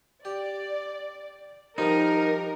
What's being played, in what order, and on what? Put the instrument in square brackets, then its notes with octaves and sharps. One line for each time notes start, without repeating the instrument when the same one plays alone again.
[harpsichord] G4 [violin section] D5
[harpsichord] F3 G3 D4 [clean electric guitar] D#4 [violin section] A#4